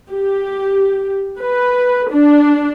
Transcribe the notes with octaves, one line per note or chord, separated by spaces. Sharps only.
G4
B4
D4